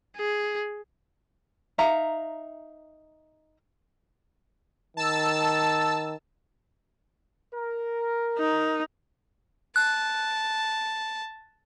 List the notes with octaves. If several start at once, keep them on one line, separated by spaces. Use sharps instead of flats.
G#4
D#4 E5 F5 A#5
D#3 A5 E6
A#4
D#4
A5 F#6